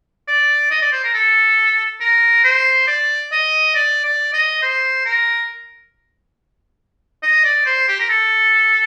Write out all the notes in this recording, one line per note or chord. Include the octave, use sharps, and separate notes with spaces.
D5
D#5
D5
C5
A#4
A4
A#4
C5
D5
D#5
D5
D5
D#5
C5
A#4
D#5
D5
C5
G4
A#4
A4